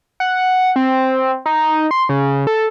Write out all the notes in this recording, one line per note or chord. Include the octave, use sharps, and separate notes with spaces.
F#5
C4
D#4
C6
C#3
A4